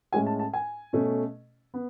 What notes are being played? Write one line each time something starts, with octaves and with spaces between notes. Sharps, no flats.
A2 G#3 C#4 G#5
A5
A5
G#5
B2 A3 C#4
B3